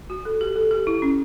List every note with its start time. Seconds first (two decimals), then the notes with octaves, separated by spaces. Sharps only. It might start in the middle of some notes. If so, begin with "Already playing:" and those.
0.10 F#4
0.25 A4
0.41 G4
0.56 A4
0.71 G4
0.87 E4
1.02 C#4